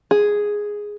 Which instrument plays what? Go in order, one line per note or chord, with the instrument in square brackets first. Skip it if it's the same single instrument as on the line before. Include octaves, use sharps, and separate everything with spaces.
[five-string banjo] G#4